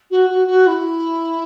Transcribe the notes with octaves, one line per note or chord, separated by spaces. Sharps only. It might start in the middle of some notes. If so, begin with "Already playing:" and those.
F#4
F#4
F#4
E4